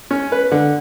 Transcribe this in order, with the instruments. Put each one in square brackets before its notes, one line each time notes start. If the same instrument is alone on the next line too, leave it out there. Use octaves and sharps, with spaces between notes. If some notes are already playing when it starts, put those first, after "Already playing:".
[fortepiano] C#4
B4
D3